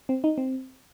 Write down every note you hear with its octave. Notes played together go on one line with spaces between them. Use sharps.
C4
D#4
C4